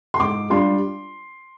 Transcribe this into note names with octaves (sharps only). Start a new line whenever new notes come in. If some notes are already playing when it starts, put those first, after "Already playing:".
C6
G#2 D6
G3 D4 F4 C6